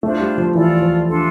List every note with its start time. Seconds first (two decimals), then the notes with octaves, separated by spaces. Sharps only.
0.03 A3 D4 F4 C5
0.20 G3
0.37 F3
0.55 E3 F4 A4 D5
0.82 F3
1.08 D4 F4 A4